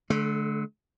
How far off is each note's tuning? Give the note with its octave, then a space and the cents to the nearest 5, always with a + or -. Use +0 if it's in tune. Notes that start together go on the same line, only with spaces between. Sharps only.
D3 +0 A3 -40